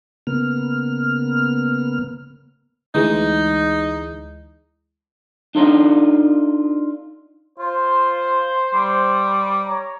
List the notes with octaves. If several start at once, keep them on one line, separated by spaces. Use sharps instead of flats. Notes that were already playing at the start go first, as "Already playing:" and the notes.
C#3 A#3 B3 F6
D2 E3 G#3 D#4
D4 D#4 F4 A4 D5 D#5
F4 C5
G3
C#5 A#5